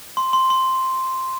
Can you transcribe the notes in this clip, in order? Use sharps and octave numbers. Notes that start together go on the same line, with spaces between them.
C6
C6
C6